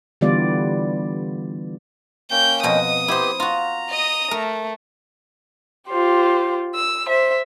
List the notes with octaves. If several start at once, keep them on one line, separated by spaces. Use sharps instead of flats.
D3 E3 G3 B3 F4 D5
A#3 C#4 G5 G6
F2 B2 D#5 D#6
B3 E4 G4 C5
F4 F#4 A#5
D#5 D#6
A3 A#4
F4 G4 C5
E6
C5 E5